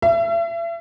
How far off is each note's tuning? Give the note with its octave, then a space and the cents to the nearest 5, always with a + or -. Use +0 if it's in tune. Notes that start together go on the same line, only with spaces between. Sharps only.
E5 +40